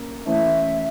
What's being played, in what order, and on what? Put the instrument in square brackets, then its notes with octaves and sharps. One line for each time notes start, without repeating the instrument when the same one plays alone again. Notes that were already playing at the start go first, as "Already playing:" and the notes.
Already playing: [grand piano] A#3 C#4
[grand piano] E3 A3 C#4 E4 [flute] E5